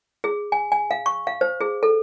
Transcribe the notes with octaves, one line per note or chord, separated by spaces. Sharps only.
G#4
G#5
G#5
F5
C#6
F5
C5
G#4
A4